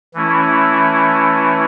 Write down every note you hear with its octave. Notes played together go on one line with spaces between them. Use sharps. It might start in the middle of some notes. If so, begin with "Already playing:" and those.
E3 A3 C#4 E4